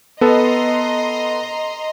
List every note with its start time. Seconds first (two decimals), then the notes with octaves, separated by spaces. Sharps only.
0.21 B3 A4 D#5 A#5 C6